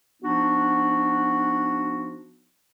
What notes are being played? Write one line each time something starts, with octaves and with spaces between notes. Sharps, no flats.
F3 B3 D4 D#4 F#4